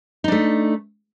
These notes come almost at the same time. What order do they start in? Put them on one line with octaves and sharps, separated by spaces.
D#4 D4 A3